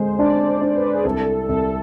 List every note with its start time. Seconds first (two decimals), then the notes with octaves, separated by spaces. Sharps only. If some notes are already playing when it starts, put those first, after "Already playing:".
Already playing: D3 G#3 C5
0.18 D4 D5
0.62 D4
0.76 B4
0.94 G#4
1.04 C2 A4
1.48 C2 A4